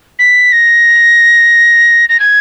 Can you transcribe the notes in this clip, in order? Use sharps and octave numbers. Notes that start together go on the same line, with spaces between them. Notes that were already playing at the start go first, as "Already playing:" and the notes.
B6
A#6
A#6
G#6